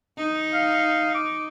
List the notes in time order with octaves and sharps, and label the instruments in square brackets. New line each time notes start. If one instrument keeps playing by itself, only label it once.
[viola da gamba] D#4
[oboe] F5
D6